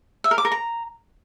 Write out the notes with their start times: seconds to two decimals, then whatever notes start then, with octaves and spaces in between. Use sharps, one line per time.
0.24 E5
0.31 A#4
0.38 D6
0.45 A#4
0.52 A#5